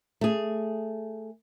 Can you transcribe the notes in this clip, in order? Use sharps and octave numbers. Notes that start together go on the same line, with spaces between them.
A3 G#4